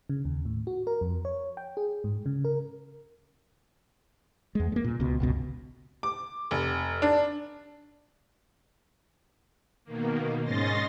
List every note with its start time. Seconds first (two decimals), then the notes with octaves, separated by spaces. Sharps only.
0.09 C#3
0.25 D#2
0.45 A2
0.67 F#4
0.87 A#4
1.01 F2
1.25 C#5
1.57 G5
1.77 G#4
2.04 G#2
2.26 C#3
2.45 A#4
4.55 E2 G#3
4.72 G#3 A#3
4.84 A#2
5.00 C#2 B2
5.20 G1 C#2 B2
6.03 D6
6.51 F1
7.02 D4
9.84 B2 D#3 A#3
10.43 G#2 C#4 D#5 C6 A6 A#6